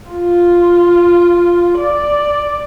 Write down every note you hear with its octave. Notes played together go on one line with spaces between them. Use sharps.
F4
D5